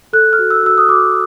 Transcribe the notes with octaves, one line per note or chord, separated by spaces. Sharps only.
A4 F#6
F6
F#4
E6
F#4 E6
D#6
F#4 D6